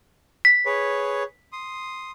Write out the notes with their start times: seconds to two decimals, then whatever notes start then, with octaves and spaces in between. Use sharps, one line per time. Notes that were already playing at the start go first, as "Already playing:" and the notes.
0.45 B6
0.66 G#4 B4 C#5
1.52 C6 D#6